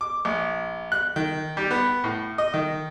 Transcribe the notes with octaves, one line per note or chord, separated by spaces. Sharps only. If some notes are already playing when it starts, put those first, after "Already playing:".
D6
A#1
F#6
D#3
G3
B3
A2
D#5
D#3